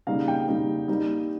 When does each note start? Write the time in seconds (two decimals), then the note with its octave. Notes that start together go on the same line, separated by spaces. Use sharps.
0.07 C#3 G3 A#3 D#4 F5
0.28 G5
0.48 C#3 G3 A#3 D#4
0.88 G3 A#3 D#4